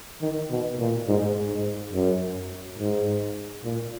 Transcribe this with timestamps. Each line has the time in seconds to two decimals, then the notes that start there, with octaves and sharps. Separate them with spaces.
0.21 D#3
0.51 B2
0.79 A#2
1.08 G#2
1.36 G#2
1.93 F#2
2.79 G#2
3.64 A#2